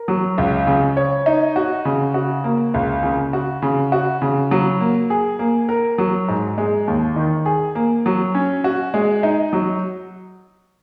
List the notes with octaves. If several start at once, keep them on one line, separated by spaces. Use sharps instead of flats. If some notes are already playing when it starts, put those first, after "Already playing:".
Already playing: A#4
F#3
C#2
C#3
C#5
D#4
F#4
C#3
F#4
A#3
C#2
C#3
F#4
C#3
F#4
C#3
F#3
A#3
G#4
A#3
A#4
F#3
G#2
G#3
D#2
D#3
G#4
A#3
F#3
C#4
F#4
G#3
D#4
F#3